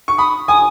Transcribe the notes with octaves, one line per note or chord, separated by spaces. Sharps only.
C#6
B5 D#6
G#5 D#6